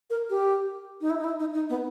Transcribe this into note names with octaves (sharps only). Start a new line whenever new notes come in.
A#4
G4
D#4
E4
D#4
E4
D#4
D#4
B3